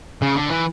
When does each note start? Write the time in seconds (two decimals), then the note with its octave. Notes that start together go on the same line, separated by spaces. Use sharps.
0.22 C#3
0.36 D3
0.50 E3